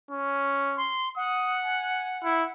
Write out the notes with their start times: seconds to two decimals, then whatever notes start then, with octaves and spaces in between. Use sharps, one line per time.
0.11 C#4
0.77 C6
1.16 F#5 D#6
1.65 G#5
2.23 E4